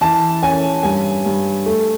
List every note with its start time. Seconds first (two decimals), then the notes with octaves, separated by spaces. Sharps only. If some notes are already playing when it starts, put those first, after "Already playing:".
0.01 E3 A5
0.42 C#4 G#5
0.83 G2 G#5
1.25 G2
1.66 A3